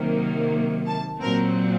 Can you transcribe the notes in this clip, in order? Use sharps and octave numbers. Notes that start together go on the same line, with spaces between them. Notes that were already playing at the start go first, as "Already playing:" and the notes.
Already playing: C3 D#3 F#3 A#3
A5
A#2 F#3 C4 A#4